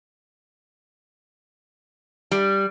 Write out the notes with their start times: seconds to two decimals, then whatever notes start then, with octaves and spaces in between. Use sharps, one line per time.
2.31 G3